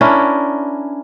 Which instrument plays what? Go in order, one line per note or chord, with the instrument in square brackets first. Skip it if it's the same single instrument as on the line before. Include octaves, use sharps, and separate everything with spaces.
[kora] C#4 D4 E4 A#4